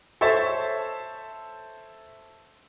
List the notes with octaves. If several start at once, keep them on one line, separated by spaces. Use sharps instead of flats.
A4 C5 C#5 E5 A5